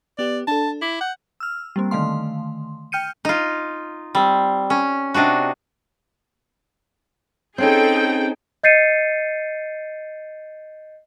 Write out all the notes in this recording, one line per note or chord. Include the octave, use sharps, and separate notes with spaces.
B3 G4 D5
D4 A4 A5
E4 D6
F#5 G6
E6 F6
G3 A#3 C4
D3 D#3 A3 F5 C6
G5 F6 G6 C#7 D#7
D#4 F4
G3 C4
C#4
C3 D4 D#4 F#4
C4 C#4 D#4 G#4 A4 G5
D#5 G6 A6 C7 C#7 D#7